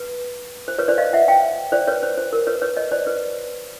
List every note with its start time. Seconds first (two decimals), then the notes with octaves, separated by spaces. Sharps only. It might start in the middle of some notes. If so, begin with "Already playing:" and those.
Already playing: B4
0.68 C5
0.78 B4 C#5
0.88 C5 D5
0.98 D#5 F5
1.13 E5 F#5
1.28 F5 G5
1.72 C5 D5
1.87 B4 C#5
2.03 C5
2.18 C5
2.33 A#4
2.47 B4 C#5
2.62 B4 C#5
2.76 C#5 D#5
2.92 C5 D5
3.07 B4